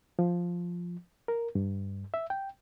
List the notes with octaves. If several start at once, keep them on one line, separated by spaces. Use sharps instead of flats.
F3
A#4
G2
E5
G5